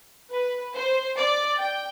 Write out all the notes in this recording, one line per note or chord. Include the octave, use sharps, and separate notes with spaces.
B4
C5
D5
G5